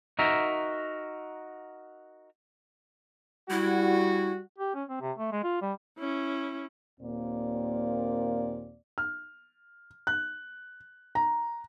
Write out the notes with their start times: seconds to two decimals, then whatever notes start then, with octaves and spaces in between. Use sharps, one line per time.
0.19 D#4 F#4 A#4 E5
3.50 G3 E4 F#4
4.58 G4
4.75 C#4
4.89 C4
5.01 C3
5.18 A3
5.32 G#3
5.44 F4
5.61 G3
5.99 C#4 E4
7.01 D#2 A#2 A#3 C4 D5
8.98 F6
10.07 F#6
11.15 A#5